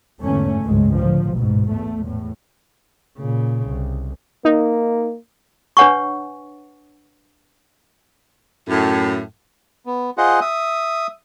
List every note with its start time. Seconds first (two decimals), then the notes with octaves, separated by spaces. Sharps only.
0.21 E2 G#2 D3 A3 C#4
0.61 G#1 C#2 G2 G#3
0.93 A1 D3 F3
1.33 G#2 B2
1.70 E2 A3
2.03 E2 A2
3.18 A#2 C#3
3.68 C2
4.45 A#3 D#4
5.77 D4 B4 C#5 F#5 G#5 C#6
8.69 F#2 A2
9.86 B3
10.18 F4 G#4 C5 D#5 F#5
10.41 E5 D#6